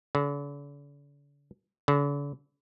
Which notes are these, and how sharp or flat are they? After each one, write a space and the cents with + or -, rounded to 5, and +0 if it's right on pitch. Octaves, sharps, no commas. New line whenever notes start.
D3 -45
D3 -45